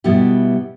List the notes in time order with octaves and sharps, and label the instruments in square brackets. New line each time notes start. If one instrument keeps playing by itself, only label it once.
[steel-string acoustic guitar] B2 G3 B3 E4 G4